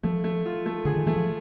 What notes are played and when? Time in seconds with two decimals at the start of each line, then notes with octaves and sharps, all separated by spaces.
0.03 F3 A3
0.24 A3
0.46 F4
0.66 A3
0.85 D3 G#4
0.96 D#3
1.07 E3 A3
1.16 F3